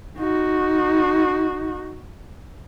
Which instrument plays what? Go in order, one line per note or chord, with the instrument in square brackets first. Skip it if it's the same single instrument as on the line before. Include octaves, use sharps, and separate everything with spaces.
[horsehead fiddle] D#4 F#4